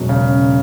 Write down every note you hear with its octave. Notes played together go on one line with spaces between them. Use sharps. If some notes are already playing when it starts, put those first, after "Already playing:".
Already playing: E1 F#3
C#3